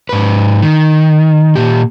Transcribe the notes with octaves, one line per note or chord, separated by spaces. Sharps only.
G#2 B4
D#3
A#2 G4